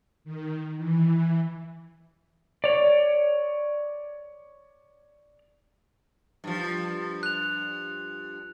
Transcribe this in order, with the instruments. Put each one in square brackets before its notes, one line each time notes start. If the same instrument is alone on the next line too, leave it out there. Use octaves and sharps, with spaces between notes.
[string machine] D#3
E3
[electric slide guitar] C#5 D5
[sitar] G2 F3
[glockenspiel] F#6 F7